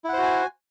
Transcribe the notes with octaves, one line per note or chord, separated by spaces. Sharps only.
E4 F#4 C5 F#5 G#5